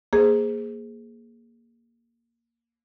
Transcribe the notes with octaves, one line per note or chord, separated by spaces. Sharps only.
A#3 G#4 C5